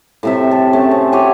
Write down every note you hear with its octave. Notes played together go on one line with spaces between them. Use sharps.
A2 C3 E5
A4
A3 C#4
C4
G4 C#5 F#5 G#5